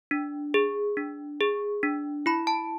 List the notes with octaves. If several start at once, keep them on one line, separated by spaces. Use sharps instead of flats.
D4
G#4
D4
G#4
D4
E4 B5
A5